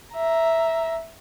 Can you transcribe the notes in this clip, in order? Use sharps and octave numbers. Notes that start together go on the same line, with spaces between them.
E5 A#5